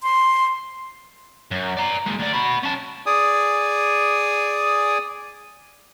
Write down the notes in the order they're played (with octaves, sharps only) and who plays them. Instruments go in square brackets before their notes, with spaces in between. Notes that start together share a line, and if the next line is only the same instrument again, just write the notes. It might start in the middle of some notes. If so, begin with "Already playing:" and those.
[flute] C6
[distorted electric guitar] F#2
D5 A#5
G#3 A#3
D2 D5
F#4 B5
C#4 A5
[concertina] G#4 D5 G#5 D#6